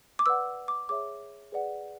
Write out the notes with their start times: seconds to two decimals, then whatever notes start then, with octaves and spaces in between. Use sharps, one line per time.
0.19 D6
0.26 B4 D5 F#5 E6
0.68 D6
0.89 G#4 C#5 E5 D6
1.52 G#4 B4 D5 F#5